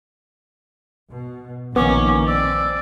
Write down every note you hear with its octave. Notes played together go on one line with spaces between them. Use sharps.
B2
A#1 D#3 A#3 B3 C#4 D6
C4 D5 E6